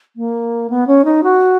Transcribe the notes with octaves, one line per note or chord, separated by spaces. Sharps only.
A#3
B3
C#4
D#4
F#4